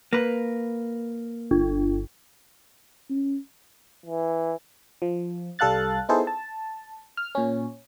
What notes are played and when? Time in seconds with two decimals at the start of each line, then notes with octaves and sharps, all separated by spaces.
0.13 A#3 B4
1.51 G1
3.10 C#4
4.06 E3
5.02 F3
5.59 C2 G3 A4 F5 F#6 A6
6.09 B3 D#4 E4 G#4 A4 C5
6.27 A5
7.17 F6
7.35 A#2 C#4